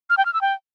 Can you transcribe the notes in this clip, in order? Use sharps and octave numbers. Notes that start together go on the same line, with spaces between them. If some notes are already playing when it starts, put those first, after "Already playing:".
F6
G5
F6
E6
G5